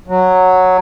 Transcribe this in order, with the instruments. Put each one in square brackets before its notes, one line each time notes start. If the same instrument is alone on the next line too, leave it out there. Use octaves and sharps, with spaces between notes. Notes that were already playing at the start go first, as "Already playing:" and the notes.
[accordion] F#3